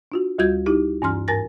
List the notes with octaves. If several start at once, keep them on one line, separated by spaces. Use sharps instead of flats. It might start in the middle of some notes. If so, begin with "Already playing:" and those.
D4 F4 F#4
D2 G3 F4 F#4 G6 G#6
D#4 E4 G4
G2 E3 C#4 A#5 C6 F6
G#2 A#4 G#5 A6 A#6